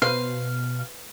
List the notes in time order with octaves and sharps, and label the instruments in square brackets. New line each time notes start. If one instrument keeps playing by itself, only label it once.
[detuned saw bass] B2 [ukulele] B4 C5 [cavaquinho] F5